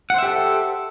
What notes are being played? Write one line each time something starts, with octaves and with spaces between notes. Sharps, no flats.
G4 A4 C5 E5 F#5